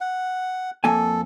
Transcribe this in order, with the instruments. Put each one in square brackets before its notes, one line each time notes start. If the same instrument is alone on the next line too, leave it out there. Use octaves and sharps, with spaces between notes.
[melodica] F#5
[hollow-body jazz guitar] F2 A#3 G#5 [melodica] A4